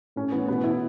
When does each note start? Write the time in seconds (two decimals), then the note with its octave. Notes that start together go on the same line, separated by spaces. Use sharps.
0.16 A2 C#4
0.32 E3 B3
0.48 B2 B3
0.64 E4